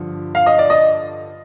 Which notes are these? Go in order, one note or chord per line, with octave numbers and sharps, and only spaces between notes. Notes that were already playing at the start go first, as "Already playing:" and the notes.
Already playing: G2 D3 F3
F5
D#5
D5
D#5